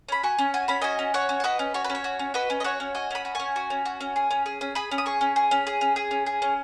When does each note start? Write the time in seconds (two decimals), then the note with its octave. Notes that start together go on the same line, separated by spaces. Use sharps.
0.09 C#4 B5
0.23 F#4 G#5 C#6
0.38 C#4
0.54 F#4 G#5
0.68 C#4 B5
0.82 F#4 D#5 G#5
0.99 C#4
1.14 F#4 C#5 F#5
1.29 C#4
1.40 F#5
1.44 F#4 B4 D#5
1.59 C#4
1.74 F#4 C#5
1.84 B4
1.90 C#4
1.95 C#5
2.04 F#4
2.19 C#4
2.34 F#4 B4 D#5
2.50 C#4
2.60 D#5
2.64 F#4 C#5 F#5
2.80 C#4
2.95 F#4 D#5 G#5
3.11 C#4 B5 D#6
3.25 F#4
3.35 C#4 G#5 C#6
3.56 F#4
3.70 C#4
3.85 F#4
4.01 C#4
4.16 G#4
4.31 C#4
4.46 G#4
4.61 C#4
4.75 G#4 B5 D#6
4.91 C#4
4.98 D#6
5.06 G#4 G#5 C#6
5.21 C#4
5.36 G#4
5.51 C#4
5.67 G#4
5.81 C#4
5.96 G#4
6.11 C#4
6.26 G#4
6.42 C#4